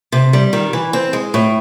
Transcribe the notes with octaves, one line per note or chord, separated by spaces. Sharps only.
C3
G3
D#3
E3
C4
G#3
A2